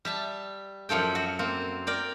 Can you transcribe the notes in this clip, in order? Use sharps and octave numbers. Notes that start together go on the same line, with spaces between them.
G3 E5 A5
F#2 F3 A4 G5
F#4
A#3 C4
A#4 D5 G5